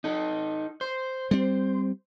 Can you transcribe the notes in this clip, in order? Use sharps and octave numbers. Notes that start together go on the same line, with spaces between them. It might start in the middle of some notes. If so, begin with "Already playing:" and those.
D#4 A4
C5
G3 C4